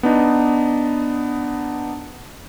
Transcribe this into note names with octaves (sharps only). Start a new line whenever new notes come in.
B3 D4 D#4